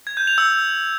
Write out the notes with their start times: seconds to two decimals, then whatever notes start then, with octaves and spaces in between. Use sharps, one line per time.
0.07 G#6
0.17 G6
0.27 F7
0.38 E6